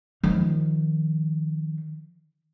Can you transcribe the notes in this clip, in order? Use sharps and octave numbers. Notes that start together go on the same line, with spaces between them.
D#3 F3